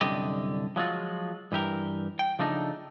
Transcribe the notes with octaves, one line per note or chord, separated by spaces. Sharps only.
C2 F#2 D3 G4 D#5
F3 F#3 G#3 F4 F#4
G2 E3 G4 A#4
G5
C#3 F3 A3 D4 D#4